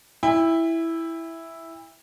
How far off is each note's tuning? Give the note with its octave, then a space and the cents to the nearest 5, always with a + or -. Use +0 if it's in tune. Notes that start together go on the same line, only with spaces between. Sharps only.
E4 +0 G5 +40